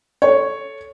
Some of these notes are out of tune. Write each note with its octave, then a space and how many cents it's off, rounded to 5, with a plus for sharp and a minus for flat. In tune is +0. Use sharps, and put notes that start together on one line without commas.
A4 +0 C#5 +0